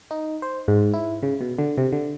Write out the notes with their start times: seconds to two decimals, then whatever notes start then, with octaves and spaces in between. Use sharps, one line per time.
0.11 D#4
0.42 C5
0.68 G#2
0.94 E4
1.23 C#3
1.41 B2
1.59 D3
1.78 C3
1.92 D3